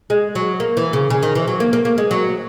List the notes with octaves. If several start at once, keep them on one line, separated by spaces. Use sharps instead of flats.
G#3
F#3
A#3
E3
C#3
C#3
D#3
E3
F#3
A#3
A#3
A#3
G#3
F#3